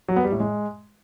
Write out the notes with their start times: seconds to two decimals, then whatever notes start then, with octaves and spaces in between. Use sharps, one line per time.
0.08 F#3
0.16 B3
0.24 G3
0.32 A2
0.40 G#3